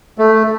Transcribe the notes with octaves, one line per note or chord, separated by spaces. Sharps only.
A3